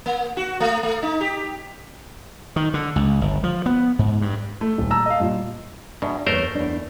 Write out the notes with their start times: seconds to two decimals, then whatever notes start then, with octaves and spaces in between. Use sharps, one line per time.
0.06 A#3
0.37 F#4
0.60 A3
0.83 A3
1.03 D#4
1.21 G4
2.56 D#3
2.74 D3
2.96 C#2
3.21 G1
3.44 F3
3.66 B3
3.99 G#2
4.22 G2
4.61 A3
4.78 D#1
4.90 A5 A#5 E6
5.06 D#5 F5
5.20 G2 A#2
6.02 E2 B2 D4
6.27 E2 C#3 A3 A#4 C5 C#5
6.55 E2 D4